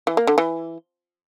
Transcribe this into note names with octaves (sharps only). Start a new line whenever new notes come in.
E3
A#3
D3
E3